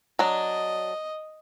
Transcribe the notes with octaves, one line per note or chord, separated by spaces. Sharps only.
F#3 D4 D#5